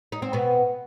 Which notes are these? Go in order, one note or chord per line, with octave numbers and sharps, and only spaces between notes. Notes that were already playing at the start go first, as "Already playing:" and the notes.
D#4
C4
B2 B3